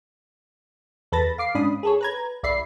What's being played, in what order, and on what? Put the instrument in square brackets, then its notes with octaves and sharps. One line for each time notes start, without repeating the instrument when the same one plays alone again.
[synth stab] E2 A4 B4 B5 A6 A#6
F5 D6 C7
G#2 C#4 D4 B5 D#6
G#4 A4 C#5
B4 A#5 G#6
B1 D5 E5 B5 C7